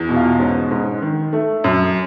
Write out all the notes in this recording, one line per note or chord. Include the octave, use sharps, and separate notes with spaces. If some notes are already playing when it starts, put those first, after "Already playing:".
Already playing: E2
B2
F4
G#2 C#4
G#2
D#3
A3
F#2